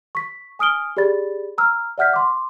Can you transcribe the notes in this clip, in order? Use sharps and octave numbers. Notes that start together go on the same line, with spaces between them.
C#6 B6
G#5 D#6 F6 D7 G7
G4 G#4 D5 B5 A6
A#5 E6 F6
D5 E5 F#5 F6 G6 B6
C6 D6